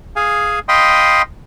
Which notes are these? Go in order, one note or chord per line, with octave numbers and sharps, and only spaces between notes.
G#4 F5 G#5
D#5 F5 G5 B5 C6 D#6